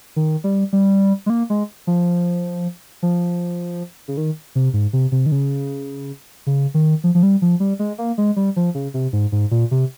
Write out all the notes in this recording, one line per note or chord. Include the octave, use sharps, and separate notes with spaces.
D#3
G3
G3
G#3
A#3
G#3
F3
F3
C#3
D#3
C3
G#2
C3
C3
D#3
C#3
C#3
D#3
F3
F3
G3
F3
G3
G#3
A#3
G#3
G3
F3
C#3
C3
G#2
G#2
A#2
C3